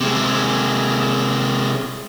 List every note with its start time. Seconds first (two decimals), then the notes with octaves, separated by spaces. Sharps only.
0.01 C3 G#3